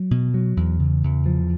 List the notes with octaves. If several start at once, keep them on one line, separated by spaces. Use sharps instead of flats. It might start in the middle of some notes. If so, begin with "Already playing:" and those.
Already playing: F#3
B2
F#3
E2
C#3
E2
F3